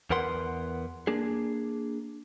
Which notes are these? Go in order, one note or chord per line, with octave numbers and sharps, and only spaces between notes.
E2 A#4 B4 F#5 C6
A#3 D4 G#4